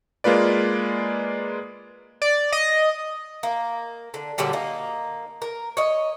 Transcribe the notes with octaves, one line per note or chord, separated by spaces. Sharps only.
G#3 A#3 F4 B4 D5
D5
D#5
A#3
D3
A#2 D3 F#3 G3
A#3 D#4
A#4
C#5 D#5